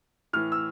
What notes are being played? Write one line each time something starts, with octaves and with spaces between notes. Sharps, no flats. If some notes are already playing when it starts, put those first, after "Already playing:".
A2 E3 F6
E6